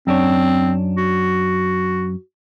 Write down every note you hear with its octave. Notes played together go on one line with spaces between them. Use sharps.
F#2 C4 D4 C#5
F#4